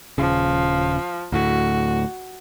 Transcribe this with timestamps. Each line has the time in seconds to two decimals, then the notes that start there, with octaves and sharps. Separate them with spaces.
0.18 D#1 C#3 F3
1.32 D2 A2 F#4